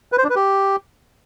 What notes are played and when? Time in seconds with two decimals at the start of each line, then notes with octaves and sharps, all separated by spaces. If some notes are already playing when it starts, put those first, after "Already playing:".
0.12 B4
0.18 C5
0.24 D4
0.30 B4
0.36 G4